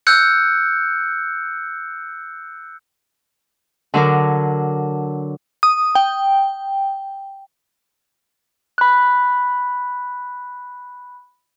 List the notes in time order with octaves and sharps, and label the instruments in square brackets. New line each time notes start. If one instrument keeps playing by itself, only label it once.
[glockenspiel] E6 F#6 G6 C#7
[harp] D3 F#3 D4 A#4
[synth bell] D#6
G5
[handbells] B5 F#6